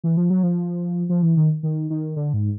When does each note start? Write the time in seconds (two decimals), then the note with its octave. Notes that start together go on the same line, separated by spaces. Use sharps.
0.04 E3
0.17 F3
0.30 F#3
0.43 F3
1.09 F3
1.23 E3
1.37 D#3
1.63 D#3
1.90 D#3
2.16 D3
2.34 G#2